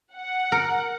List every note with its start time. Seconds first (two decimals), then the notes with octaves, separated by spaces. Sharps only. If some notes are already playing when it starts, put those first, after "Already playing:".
0.14 F#5
0.52 A#4